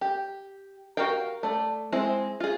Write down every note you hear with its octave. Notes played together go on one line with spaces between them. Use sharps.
G4
F#4 G4 A#4 F5 G5
A3 D5
G#3 C4 E4
F4 G#4